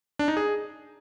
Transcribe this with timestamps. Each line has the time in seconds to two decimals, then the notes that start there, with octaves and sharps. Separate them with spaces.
0.19 D4
0.28 D#4
0.37 G#4